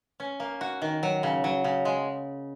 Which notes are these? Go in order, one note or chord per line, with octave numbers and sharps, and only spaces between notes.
C#4
A#3
F#4
D#3
F#3
C#3
F#3
C#3
G#3